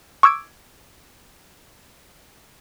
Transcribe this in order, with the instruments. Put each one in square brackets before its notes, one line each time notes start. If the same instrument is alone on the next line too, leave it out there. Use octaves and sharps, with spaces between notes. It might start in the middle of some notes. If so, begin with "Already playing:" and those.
[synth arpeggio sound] C#6 D6 E6 G#6 D7